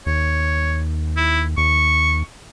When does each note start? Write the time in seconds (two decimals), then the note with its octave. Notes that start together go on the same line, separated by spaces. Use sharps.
0.06 D#2 C#5
1.16 E4
1.57 D#2 C#6